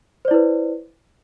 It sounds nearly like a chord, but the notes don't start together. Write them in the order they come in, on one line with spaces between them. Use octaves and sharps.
C5 D5 E4 B4